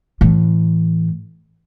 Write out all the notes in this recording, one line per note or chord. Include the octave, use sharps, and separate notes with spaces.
A2 E3